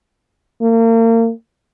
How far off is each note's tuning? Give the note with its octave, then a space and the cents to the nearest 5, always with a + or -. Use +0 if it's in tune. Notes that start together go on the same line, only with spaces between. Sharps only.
A#3 -35